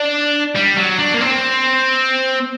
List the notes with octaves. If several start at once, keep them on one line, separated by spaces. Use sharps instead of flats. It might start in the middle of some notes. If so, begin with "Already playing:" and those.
Already playing: D4
G3
F#3
D4
A#3
C4